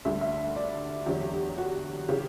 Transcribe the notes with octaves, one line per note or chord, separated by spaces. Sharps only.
D2 D3 G3 E5
E5
D5
E2 D3 F#3 G4
F#4
C#3 E3 G4